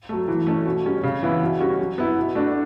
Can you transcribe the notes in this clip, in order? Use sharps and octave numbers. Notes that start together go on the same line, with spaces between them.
F#3 A3
E3
A3 C#4
B2
G3 C#4
C#3
E3 B3 E4
B2
G3 C#4 F#4
F#3
B3 E4
B2
A3 D4 F#4